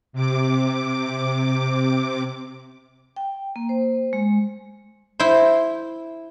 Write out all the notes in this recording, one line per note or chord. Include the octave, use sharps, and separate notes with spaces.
C3 D6
G5
A#3
C5
G#3
E4 C5